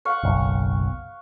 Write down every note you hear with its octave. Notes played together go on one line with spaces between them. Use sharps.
F5 F#5 C#6
F#1 B1